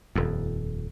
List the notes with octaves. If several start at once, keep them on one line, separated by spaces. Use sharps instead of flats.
D#1 F2